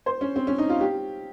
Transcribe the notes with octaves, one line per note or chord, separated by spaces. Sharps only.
C5
C#4
C4
C#4
D#4
F4
G4